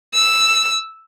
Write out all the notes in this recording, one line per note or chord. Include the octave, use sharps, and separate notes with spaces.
E6